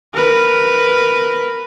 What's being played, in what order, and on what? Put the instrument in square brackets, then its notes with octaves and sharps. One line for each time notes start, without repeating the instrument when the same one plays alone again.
[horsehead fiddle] A#4 B4